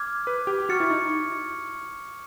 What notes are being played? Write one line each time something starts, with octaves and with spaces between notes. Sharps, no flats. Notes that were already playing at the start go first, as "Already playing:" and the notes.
Already playing: D6 F6 G#6
B4
G4
F#4 C#6 F6 A6 C#7
E4
D#4